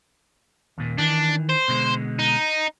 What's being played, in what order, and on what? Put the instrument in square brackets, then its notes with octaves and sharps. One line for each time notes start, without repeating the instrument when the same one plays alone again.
[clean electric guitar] D#2 A#2
[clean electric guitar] D#3 E3 [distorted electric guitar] D4
[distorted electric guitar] C5
[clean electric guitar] B2 D3 G#3
[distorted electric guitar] D#4